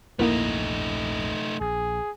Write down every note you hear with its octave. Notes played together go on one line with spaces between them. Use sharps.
A#1 E2 G2 A3 A#3 D#4 E4 A#4
A#1 G#4